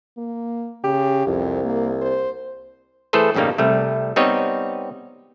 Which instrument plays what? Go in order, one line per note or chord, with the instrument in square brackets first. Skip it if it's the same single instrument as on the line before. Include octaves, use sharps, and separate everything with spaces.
[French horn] A#3
[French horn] C#3 [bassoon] G4
[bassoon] C2 [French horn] F2
[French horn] A#3
C5
[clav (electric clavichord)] E3 A3 G#4 A4 B4 C5
A1 G2 C#3 G3 A#3 D#4
C2 G3 A3
G3 B3 C4 D#4 C#5 D#5